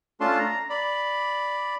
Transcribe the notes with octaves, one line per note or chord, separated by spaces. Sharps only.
A3 C#4 D4 F4 A5 C6
A#5
D5 B5